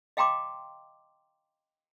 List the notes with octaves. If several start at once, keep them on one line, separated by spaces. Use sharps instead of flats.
D#5 F5 G5 A#5 C6 D6